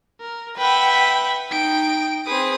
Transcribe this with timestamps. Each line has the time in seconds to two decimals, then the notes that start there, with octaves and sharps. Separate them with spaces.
0.20 A#4
0.57 B4 E5 F#5 G5
1.51 D#4 G5 D7
2.26 C4 G#4 B4 D#6